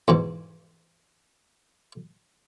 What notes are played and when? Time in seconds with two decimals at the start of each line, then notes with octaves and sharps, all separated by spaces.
0.08 E2 G#2 B2